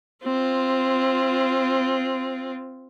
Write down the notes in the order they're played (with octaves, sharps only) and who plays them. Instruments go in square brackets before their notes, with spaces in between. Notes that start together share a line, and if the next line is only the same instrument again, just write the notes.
[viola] C4 F4